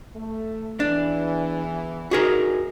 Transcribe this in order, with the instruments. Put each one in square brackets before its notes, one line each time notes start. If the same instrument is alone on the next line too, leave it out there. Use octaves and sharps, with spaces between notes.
[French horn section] A3
[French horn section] E2 E3 [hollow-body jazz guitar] D4
[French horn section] D2 D#4 [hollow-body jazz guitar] F#4 G#4 A#4